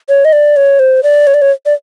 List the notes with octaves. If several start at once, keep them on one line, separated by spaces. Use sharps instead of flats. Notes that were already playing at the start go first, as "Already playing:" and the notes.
C#5
D#5
D5
C#5
C5
D5
C#5
D5
C#5
D5